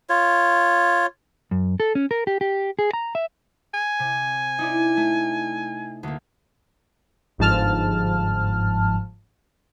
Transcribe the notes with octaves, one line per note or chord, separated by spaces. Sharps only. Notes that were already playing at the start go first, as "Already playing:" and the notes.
F4 C#5
F#2
A4
C#4
A#4
G4
G4
G#4
A#5
E5
G#5
C3
D#4 E4 D5
A3
D2 A#3
G1 G#2 F3 A5 F6